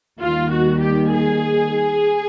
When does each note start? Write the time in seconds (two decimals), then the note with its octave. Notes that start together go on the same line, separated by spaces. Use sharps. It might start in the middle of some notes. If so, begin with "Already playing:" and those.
0.20 D#2 D#3 G3 F4
0.51 F#4
0.82 G4
1.11 G#4